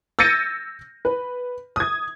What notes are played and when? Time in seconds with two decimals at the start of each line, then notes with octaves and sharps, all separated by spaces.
0.19 E6 G6 A6 A#6 C#7 D#7
1.05 B4
1.76 D#6 G#6